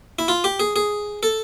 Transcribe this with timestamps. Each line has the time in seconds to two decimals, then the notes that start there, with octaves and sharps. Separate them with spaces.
0.19 E4
0.28 F4
0.44 G4
0.60 G#4
0.76 G#4
1.23 A4